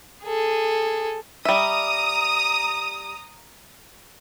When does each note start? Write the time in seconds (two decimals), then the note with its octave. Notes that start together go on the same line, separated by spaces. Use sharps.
0.23 G#4 A4
1.45 G3 E5 A#5 D#6